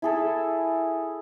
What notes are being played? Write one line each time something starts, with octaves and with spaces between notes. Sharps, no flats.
E4 G#4 A4